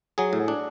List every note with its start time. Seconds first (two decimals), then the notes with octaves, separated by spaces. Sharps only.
0.18 F#3 G#4
0.33 A2
0.48 D4